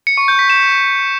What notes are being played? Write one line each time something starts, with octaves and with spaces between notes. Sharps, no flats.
C#7
C#6
G6
B6
E7